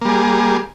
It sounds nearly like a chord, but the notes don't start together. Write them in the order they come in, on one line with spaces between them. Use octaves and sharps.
A#3 G3 G#4